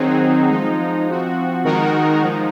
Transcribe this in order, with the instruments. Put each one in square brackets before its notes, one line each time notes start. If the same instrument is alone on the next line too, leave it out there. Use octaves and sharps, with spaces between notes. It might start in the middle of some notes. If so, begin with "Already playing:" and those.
Already playing: [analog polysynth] D#3 F#3 C4 D#4 G#4
F3 G#3 D#4
F3 C4 F#4
D#3 G#3 D#4 F#4 A#4
F3 G#3 D#4